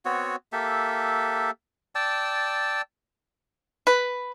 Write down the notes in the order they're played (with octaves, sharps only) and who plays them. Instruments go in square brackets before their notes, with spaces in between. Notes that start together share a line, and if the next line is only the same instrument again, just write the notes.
[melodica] B3 C4 F#4 C#5
A#3 G4 A4 E5
D5 G5 A5 E6
[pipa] B4